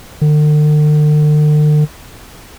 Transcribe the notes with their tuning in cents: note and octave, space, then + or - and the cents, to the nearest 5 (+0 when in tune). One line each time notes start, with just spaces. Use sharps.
D3 +45